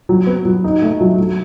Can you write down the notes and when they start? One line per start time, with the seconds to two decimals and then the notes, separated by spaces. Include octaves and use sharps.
0.09 F#3
0.27 B3
0.45 F#3
0.64 D#4
0.82 A3
1.01 F#3
1.18 F#3